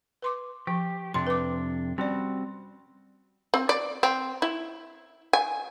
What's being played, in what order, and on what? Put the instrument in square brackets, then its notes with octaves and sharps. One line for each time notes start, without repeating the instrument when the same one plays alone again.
[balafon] B4 C6 D6
[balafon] F3 [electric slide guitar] G4
[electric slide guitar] F2 C3 D4 [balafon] C6
[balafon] B4 D6
[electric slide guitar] G3 C4 F#4 [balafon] C#4 D5
[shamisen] C4
D5
C4
E4
G#5